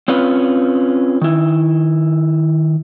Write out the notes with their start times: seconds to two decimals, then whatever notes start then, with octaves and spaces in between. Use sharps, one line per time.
0.08 C4 C#4 F4 B4
1.21 D#3 E4